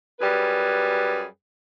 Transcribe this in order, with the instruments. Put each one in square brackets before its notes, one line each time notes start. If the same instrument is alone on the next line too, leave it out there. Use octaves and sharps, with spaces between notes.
[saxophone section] F#2 G3 G#4 B4